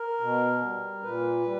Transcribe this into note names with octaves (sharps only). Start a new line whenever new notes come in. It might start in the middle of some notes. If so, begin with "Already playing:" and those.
Already playing: A#4
B2
G3
A#2 B4
G3